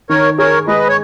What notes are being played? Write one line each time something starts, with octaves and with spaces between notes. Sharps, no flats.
D#3 A#4 C#5
G#4 A#4 C#5
G#3 B4 D#5
C#5